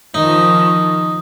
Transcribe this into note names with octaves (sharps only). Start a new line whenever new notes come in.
D#3 F3 D#4